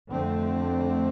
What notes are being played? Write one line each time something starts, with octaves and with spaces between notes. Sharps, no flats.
F2 D3 A3 C4